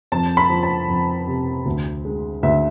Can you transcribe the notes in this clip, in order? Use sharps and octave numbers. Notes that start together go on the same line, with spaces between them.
F2 A5
B5
F3
A5
F2
C3
D2
G#3
D2 E5